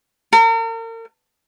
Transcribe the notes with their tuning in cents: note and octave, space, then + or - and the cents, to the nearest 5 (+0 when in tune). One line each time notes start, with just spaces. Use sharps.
A#4 -40